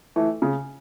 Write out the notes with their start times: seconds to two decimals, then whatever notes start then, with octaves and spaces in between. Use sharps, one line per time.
0.16 E3 A3
0.42 C#3